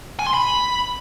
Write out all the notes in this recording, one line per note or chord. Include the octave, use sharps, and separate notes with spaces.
G#5
C6
B5